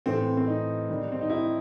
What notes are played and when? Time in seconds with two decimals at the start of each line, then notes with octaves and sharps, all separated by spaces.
0.06 A2 E3 A3 C4
0.37 C4
0.47 D#4
0.89 D#3 G3
1.12 C4
1.21 D#4
1.30 E4